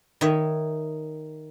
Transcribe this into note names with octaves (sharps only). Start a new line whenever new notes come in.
D#3 C#5 D#5 E5